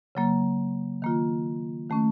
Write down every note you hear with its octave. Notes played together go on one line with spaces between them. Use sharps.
C#3 F#3 A#3
D#3 A#3 F4
D#3 A3 C#4